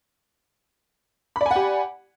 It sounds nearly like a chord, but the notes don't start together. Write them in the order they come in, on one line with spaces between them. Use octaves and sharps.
B5 D5 G#5 F#5 G4